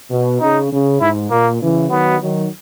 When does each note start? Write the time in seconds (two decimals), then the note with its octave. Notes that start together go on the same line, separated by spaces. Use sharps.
0.10 B2
0.40 C#3 D#4
0.71 C#3
1.01 G#2 E4
1.30 A#2 A#3
1.61 C#3 E3
1.90 D#3 F#3 B3
2.21 D#3 F#3